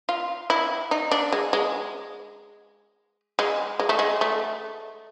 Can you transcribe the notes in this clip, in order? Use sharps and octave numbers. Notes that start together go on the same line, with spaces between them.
F4
E4
D#4
D4
G#3
G#3
G#3
G#3
A3
G#3
A3